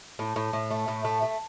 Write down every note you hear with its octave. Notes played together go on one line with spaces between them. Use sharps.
A2
A2
A2
A3
A2
A3
A3